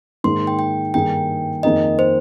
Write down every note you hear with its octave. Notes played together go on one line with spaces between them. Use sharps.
G#2 D#3 A#3 D#4 C6
G5
G5
G2 D#3 A#3 D#4 G#4 G5
F2 D#3 A#3 D#4 G#4 D#5
C5